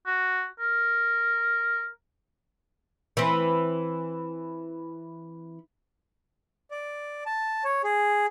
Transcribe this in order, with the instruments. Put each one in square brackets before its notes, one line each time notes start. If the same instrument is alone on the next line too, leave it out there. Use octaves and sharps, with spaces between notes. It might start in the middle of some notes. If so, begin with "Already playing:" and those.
[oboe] F#4
A#4
[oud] E3 C4
[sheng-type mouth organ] D5
A5
C#5
G#4